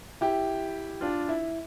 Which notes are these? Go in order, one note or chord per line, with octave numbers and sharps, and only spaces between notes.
E4 G4
D4 F4
E4